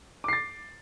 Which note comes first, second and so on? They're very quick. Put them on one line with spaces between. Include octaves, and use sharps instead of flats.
D6 C7 A6